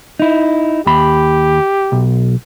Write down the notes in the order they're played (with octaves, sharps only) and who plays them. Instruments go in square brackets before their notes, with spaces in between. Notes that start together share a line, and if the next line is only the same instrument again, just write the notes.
[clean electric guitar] D#4 E4
[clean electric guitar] D#2 B5 [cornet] G4
[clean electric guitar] B1